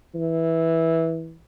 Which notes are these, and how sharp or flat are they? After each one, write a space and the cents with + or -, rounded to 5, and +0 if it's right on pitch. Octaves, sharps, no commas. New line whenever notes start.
E3 -10